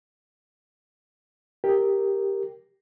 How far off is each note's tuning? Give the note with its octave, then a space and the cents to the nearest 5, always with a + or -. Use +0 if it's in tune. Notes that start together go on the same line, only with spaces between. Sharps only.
G4 +5 A#4 +0